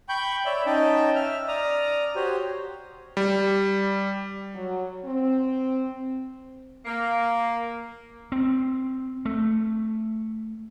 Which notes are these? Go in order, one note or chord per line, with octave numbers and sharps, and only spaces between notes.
G5 B5 C#6 G6
C#5 D5 E5 B5
C#4 D#4 D#5 G5 A5
E5 F6
D5 A#5 D#6 F6
F#4 G4 C5 C#5
G3
F#3
C4
A#3
C4
A3